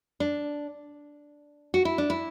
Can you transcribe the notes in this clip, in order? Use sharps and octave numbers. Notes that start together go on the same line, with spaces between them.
D4
F#4
E4
D4
E4